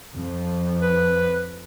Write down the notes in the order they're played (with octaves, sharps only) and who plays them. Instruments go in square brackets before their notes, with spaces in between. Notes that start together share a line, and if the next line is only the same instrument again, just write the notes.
[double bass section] F2 F3
[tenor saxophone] B4